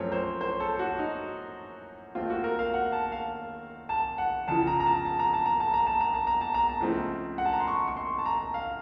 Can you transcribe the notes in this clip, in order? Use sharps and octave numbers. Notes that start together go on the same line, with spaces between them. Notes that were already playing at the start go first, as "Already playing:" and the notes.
Already playing: F#2 F3 A3 C4 C#5
C5
C5
A4
F#4
D#4
D#2 D#3 A3 C4 F4
F#4
A#4
F5
F#5
A5
F5
A5
F#5
F2 C#3 F3 A5
A#5
A#5
A5
A5
A#5
A5
A#5
A5
A#5
A5
A#5
A5
A#5
A5
A#5
A5
C#2 C#3 F3 A3 C4
F#5
A5
A#5
C6
C#6
C#6
C6
A5
A#5
F5